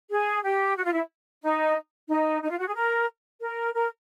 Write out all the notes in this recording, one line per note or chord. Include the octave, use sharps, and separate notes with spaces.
G#4
G4
F#4
F4
E4
D#4
D#4
D#4
F4
F#4
G#4
A#4
A#4
A#4